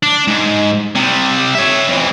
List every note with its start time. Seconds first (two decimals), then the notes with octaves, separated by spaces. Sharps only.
0.03 D4
0.28 G#2
0.95 C3 G3
1.55 C#5 E5
1.88 F2 E3